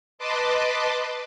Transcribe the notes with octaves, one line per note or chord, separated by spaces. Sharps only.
B4 D#5 A5 C6 D6